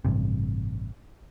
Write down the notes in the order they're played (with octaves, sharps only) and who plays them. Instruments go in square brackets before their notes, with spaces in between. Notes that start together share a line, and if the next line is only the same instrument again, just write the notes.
[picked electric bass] A1 G2 C3